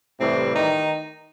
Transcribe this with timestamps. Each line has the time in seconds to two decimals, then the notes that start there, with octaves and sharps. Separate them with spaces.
0.19 A2 C3 E3 G3 C4
0.55 D#3 D#4